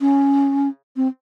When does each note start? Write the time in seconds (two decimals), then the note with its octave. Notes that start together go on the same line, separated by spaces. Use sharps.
0.01 C#4
0.96 C4